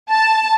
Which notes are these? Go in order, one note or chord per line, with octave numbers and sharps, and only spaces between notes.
A5